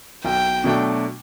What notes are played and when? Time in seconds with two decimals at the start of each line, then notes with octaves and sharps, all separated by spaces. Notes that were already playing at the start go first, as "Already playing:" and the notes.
0.25 B1 G5
0.64 B2 F#3 A3 D4